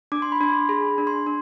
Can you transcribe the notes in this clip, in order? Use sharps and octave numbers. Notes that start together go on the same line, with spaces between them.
D4 D6
C6
B5
D4 C6
G#4 B5
D4
C6
D4